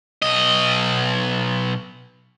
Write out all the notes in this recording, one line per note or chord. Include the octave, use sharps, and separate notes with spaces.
B1 D#5